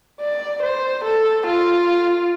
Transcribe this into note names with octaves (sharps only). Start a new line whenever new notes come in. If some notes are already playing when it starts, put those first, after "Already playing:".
D5
C5
A4
F4